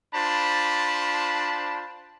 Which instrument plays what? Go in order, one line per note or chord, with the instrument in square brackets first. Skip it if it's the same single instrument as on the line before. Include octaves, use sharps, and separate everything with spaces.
[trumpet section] D4 F4 C5 A5 B5